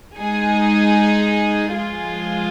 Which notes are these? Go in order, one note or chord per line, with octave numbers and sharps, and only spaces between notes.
G#3 D#4 G#4
F3 G#3 F4 G#4